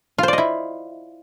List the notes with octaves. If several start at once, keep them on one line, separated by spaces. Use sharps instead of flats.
E4 F4 C5 D5 D#5